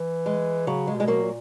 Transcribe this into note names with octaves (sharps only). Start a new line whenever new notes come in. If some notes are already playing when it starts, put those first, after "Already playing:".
Already playing: E3
G#3
C#3 F#3
G#3
B2
G#3
F#3 A#3
A#2